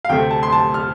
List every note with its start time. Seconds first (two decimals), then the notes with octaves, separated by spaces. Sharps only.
0.05 F5
0.09 D2 C3 A3 C4 G5
0.31 A5
0.43 C6
0.52 A5
0.74 F6